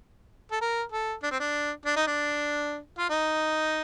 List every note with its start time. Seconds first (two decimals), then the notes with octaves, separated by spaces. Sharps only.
0.52 A4
0.61 A#4
0.92 A4
1.23 D4
1.31 C4
1.40 D4
1.85 D4
1.96 D#4
2.07 D4
2.98 F4
3.10 D#4